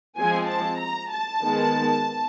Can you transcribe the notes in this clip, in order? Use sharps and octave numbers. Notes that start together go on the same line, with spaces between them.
F3 G#3 C4 G#5
A5
A#5
A5
D#3 G#3 B3